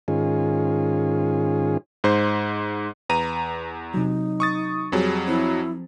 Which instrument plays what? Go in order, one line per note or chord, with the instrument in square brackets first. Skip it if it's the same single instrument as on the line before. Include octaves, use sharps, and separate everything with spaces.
[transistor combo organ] G#2 D#3 C#4 F4 G#4
[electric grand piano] G#2 C5
[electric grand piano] E2 A#5 D#7 [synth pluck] B4
[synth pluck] C3 F#3 [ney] D#4
[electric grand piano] C#6 D#6 A6
[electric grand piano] F2 F#3 [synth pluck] G3 C4 G#4
[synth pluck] F3 C4 [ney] E4